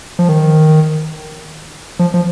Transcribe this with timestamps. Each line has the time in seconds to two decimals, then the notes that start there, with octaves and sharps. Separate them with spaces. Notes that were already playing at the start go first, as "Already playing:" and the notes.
0.19 F3
0.28 D#3
1.99 F3
2.14 F3